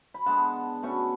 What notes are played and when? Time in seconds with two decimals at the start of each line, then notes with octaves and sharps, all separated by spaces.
0.14 B5
0.26 D3 G#3 B3 F#5 A5
0.83 B2 A3 C#4 C#6